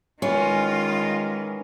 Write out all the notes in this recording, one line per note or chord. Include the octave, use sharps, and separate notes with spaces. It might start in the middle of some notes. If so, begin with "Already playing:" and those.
D#3 E3 G#3 C#4 F4